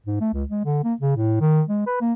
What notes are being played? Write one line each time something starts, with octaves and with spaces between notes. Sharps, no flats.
G#2
A3
C#2
G#3
D3
A#3
C#3
A2
D#3
G#3
B4
A#3